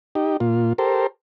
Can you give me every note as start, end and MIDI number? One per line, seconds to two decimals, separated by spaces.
0.15 0.37 63
0.15 0.37 67
0.40 0.73 46
0.40 0.73 65
0.78 1.07 67
0.78 1.07 69
0.78 1.07 70
0.78 1.07 72